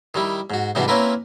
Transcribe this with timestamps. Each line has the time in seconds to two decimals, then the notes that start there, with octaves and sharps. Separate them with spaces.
0.14 D#3 G3 E4
0.50 G#2 F#4
0.75 G#2 C3 E3 G3 D4 F#4
0.88 A#3 C4 C#4 E4 A#4 B4